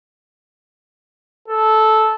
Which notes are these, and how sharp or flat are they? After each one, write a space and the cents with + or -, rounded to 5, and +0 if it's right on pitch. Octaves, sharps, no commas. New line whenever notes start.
A4 -10